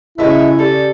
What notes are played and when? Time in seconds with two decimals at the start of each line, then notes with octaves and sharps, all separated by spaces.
0.18 C#3 F#3 G#3 A3 C#4 E4 E5
0.59 G3 A4